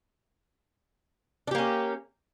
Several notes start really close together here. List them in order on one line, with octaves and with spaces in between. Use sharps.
D4 G4 A#3 C#4